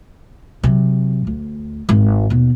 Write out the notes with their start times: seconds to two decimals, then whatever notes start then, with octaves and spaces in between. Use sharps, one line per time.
0.63 C3 F#3
1.27 D2
1.89 G#1
2.30 D#2 B2